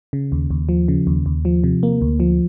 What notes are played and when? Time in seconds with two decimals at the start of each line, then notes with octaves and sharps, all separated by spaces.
0.13 C#3
0.32 D#2
0.50 D#2
0.69 F3
0.88 C#3
1.07 D#2
1.26 D#2
1.45 F3
1.64 C3
1.83 A#3
2.01 D2
2.20 F3